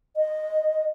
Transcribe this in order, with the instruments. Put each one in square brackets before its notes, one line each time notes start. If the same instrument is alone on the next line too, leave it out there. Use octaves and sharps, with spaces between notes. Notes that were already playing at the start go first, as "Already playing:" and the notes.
[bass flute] D#5